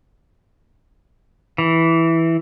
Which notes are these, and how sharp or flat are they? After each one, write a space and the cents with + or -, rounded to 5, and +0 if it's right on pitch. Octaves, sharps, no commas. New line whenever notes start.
E3 -5